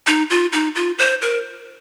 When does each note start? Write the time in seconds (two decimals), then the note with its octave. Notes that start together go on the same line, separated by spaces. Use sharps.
0.07 D#4
0.30 F4
0.52 D#4
0.75 F4
0.98 C5
1.22 A#4